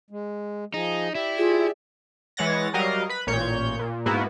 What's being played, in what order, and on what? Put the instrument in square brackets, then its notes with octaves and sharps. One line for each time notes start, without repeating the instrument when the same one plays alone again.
[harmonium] G#3
[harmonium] F3 G#4 [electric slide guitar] D#4
[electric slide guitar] E4 [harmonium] G4 D5 E5
[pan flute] F4 [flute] G#4
[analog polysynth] E3 G#3 C#5 F#5 A6 A#6
F#3 G3 A#4 D#5 F5
B4 B5
A1 A#2 C#5 G6
A#2
G#2 A#3 B3 E4 F#4